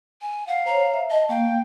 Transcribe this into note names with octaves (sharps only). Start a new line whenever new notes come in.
G#5
F5 F#5
C5 C#5 A#5
E5
D#5 A5
A#3 F5 G5